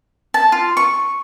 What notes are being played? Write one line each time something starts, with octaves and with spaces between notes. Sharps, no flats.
A5
F4
C#6